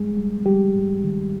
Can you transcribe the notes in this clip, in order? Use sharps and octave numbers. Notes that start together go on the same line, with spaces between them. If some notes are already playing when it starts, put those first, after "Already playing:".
Already playing: G#2 G3 G#3 G#4
G3
G3 G4
G#2
D#3